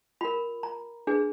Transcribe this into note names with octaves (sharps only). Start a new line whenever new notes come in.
F4 A#4 B5
A#5
D4 G#4 B4